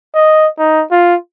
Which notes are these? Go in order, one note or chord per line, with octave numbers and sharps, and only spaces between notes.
D#5
D#4
F4